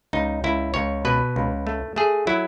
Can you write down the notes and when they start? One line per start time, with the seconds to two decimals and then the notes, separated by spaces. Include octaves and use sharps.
0.13 C#2 D#4
0.44 C#2 E4
0.74 C#2 C#5
1.05 B2 B4
1.36 C#2
1.67 A3
1.96 A3 G#4
2.27 F#3 E4